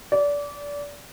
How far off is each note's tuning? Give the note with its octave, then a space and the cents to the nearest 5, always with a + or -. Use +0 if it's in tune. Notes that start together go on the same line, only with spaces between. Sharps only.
D5 -25